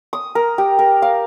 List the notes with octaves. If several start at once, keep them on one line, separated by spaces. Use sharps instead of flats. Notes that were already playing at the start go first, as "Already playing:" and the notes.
D#6
A#4
G4
A#4
F5